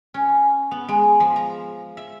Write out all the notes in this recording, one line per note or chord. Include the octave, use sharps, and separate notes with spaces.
C#4
B3
G#3
F3
A#5
E5